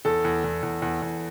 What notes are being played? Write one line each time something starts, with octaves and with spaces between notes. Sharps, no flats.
E2 A4
E2
E2
E2
E2
E2